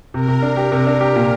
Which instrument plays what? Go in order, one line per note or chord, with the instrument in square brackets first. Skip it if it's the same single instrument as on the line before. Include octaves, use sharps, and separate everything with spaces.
[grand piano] C3 [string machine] A#4
[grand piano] C3
D4
G4
C3
D4
G4
A#2